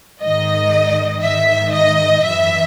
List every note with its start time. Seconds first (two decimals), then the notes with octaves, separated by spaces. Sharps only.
0.21 G#2 D#3 D#5
1.22 G#2 D#3 E5
1.73 D#5
2.24 F#2 E3 E5